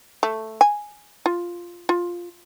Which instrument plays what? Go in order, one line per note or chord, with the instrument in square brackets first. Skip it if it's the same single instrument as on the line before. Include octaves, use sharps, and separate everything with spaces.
[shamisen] A3
G#5
F4
F4